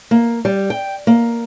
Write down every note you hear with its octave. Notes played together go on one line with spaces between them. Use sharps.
A#3
G3
G5
A#3